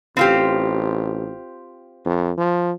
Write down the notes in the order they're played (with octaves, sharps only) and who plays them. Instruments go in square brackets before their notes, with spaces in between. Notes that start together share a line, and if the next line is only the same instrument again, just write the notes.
[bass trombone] A1 [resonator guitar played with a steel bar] C4 F4 G4
[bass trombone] F2
F3